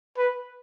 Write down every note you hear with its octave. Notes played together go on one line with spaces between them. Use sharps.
B4